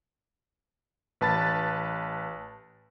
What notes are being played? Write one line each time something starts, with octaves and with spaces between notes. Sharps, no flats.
A1 B4 A5 B5 A6